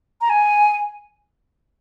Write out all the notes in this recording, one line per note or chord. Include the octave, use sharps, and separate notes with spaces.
A#5
G#5